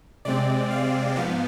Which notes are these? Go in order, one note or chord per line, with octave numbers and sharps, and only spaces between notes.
C3 G#3 C4 D5
F5
G#2 F3 B3 F5